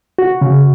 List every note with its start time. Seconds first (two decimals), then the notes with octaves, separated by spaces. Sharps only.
0.19 F#4
0.41 C#3